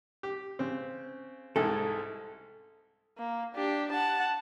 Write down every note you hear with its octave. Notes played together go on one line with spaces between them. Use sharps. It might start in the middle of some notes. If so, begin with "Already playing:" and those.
G4
C#3 C4
C2 G#2 G#4 A4
A#3
D4 G4
F#5 A5